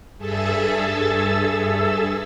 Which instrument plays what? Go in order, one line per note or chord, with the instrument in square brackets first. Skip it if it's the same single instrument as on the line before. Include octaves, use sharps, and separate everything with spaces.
[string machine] G2 G#4 A4 E5 E6 A6